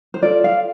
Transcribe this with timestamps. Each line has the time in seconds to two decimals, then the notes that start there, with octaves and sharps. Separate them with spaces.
0.14 C5
0.22 F4 A4 D5
0.44 F5